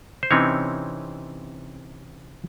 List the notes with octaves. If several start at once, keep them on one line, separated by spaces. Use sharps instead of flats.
C5
C3 E3 C4 C#4 D#4 C#5